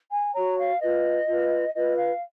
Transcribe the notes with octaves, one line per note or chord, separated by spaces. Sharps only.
G#5
F#4 C#5 A#5
F5
F4 B4 D#5
F4 B4
F4 B4 D#5
F5